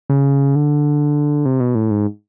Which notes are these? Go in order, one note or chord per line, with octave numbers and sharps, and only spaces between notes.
C#3
D3
C3
B2
A2
G#2